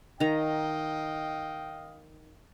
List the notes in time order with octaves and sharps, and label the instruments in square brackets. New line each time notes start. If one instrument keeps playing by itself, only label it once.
[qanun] D#3 A#5 [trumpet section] D#5 F5 G5